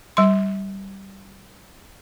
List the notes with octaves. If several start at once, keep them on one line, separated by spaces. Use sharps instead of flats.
G3 C6